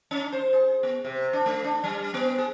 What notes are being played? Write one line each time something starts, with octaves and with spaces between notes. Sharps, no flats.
C#4
C5
G#4
B3
C3
D4
A3
D4
G3
B3
G#4